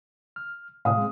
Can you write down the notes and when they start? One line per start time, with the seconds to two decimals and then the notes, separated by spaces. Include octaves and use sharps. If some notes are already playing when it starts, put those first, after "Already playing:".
0.36 F6
0.85 A2 C3 F5 D#6
0.98 G#3 C4